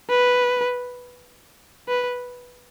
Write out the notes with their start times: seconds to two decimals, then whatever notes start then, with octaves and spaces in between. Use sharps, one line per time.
0.10 B4
1.88 B4